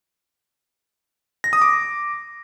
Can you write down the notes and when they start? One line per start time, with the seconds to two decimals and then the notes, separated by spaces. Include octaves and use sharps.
1.44 A#6
1.53 D#6
1.62 D6